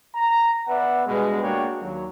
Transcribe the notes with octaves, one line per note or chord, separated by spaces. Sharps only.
A#5
B3 B4 D5 E5 F#5
G2 B2 G#3
A#3 D4 F#4 C#5 G5
D#2 F#3